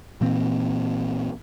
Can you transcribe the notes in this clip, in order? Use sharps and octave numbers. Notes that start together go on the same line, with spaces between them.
A#2 E3 A#3 C4